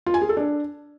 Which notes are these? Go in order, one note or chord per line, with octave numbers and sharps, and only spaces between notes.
F4
G#5
G#4
A4
D4